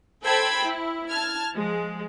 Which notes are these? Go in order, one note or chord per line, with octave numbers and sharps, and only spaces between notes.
A4 C5 G5 A5 B5 G#6
E4
A5 F6 G#6
F3 G#3